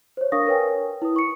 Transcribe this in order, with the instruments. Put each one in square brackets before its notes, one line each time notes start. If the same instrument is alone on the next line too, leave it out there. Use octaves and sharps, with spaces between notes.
[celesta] C5 C#5
D4 A#4 F5 C#6 D#6 A#6
A#4 B4 C#5 G5 G#5
E4 B4 D#6
C#6 C#7